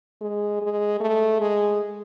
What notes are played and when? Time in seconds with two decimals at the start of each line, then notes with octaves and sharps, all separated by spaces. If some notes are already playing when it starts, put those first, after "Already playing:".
0.21 G#3
0.62 G#3
1.00 A3
1.40 G#3